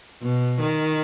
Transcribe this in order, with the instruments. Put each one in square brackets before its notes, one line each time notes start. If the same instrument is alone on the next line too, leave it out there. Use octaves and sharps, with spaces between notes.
[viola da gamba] B2
D#3